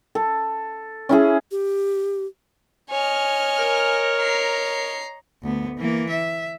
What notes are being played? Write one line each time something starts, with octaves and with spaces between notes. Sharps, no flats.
A4
C#4 E4 G#4
G4
C#5 D#5 G#5 F6
A#4
A#5 C7
D2 B3
E3 A#3
E5